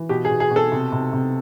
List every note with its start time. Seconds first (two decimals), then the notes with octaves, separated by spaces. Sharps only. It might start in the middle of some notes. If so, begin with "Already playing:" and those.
Already playing: E3
0.09 B2 G4
0.25 G#4
0.30 B2
0.40 G#4
0.51 B2
0.56 A4
0.72 C3
0.92 C3
1.13 C3